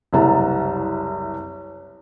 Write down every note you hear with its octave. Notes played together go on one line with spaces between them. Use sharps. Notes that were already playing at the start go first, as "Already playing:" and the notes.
F#1 C2 C3 A5 A#5